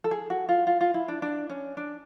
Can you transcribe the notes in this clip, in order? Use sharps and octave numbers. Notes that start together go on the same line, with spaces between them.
A4
G#4
F#4
F4
F4
F4
E4
D4
D4
C#4
D4